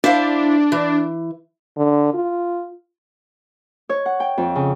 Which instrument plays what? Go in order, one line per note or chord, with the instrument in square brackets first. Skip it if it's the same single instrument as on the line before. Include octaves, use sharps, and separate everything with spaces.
[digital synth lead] D4 [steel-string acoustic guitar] E4 C5 F5
[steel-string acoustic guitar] E3
[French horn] D3
F4
[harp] C#5
F#5
G5
F2
C#3